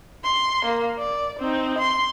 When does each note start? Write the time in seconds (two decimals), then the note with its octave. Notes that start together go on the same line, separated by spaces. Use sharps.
0.24 C6
0.65 A#3
0.99 D5
1.39 C4 D#4
1.78 C6